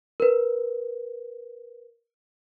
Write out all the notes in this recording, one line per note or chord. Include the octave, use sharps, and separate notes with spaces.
A#4 B4